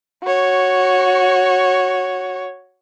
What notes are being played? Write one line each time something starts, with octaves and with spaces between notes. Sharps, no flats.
F#4 C#5